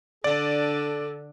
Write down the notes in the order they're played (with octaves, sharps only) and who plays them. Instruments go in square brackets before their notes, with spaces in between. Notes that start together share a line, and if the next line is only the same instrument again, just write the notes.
[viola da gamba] D3 D4 [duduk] A4 [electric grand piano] D5